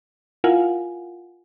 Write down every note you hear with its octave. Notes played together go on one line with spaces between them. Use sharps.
E4 F4 A#4 F5 F#5 G#5